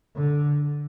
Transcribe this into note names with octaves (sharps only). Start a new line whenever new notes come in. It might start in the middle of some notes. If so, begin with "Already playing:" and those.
D3